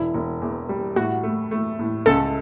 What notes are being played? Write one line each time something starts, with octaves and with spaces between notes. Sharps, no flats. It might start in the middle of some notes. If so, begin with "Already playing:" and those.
Already playing: E1 E4
E1
E2
G3
A2 F#4
A3
A3
A2
C#2 A4